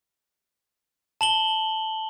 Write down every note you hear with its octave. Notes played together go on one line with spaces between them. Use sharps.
A5 F#7 G7